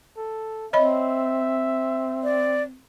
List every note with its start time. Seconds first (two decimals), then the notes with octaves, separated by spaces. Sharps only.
0.17 A4
0.73 C4 C#5 D#5 E5 B5
2.23 D5